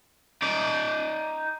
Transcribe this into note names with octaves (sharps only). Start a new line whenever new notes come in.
D#4 D5